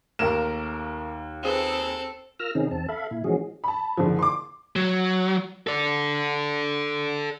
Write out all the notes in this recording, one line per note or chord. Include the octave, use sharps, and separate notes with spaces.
D#2 A3 A#3 A#4 E7
C4 F4 G#4 A4 B4
F4 A#4 E6 F6 A#6
C3 D#3 C4 C#4 D#4 G#4
E2 C4 A5
A4 E5 F5 B5
A#2 E4
E3 F3 G#3 C#4 F#4 G#4
A5 B5
F#1 D3 F3
C6 D6
F#3
A4 D5